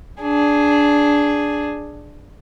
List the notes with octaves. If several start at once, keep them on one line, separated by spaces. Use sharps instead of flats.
D4 G#4